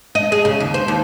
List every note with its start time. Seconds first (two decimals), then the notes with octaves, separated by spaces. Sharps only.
0.15 D#5
0.32 G#4
0.45 C#3
0.60 D#2
0.74 C5
0.88 D#2